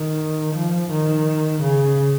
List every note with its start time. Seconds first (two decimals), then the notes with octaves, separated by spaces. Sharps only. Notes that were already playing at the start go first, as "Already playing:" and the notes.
Already playing: D#3
0.55 F3
0.91 D#3
1.61 C#3